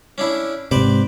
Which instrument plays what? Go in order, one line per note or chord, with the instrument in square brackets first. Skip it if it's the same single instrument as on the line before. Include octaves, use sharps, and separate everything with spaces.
[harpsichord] C#4 D4 E4
[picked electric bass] G#2 C3 [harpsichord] B4 C5 D5